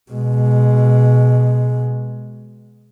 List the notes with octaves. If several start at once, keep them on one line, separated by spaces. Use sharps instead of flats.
B2 G#3